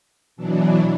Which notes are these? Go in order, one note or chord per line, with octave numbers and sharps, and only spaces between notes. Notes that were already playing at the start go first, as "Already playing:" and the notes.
B2 E3 F#3 D4